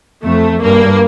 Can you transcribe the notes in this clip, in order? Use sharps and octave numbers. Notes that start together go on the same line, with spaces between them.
F2 A3
G2 A#3